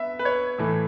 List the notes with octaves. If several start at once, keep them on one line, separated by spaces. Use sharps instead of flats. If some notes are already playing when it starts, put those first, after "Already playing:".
Already playing: B3 E5
B4
C#5
A2 E3 A3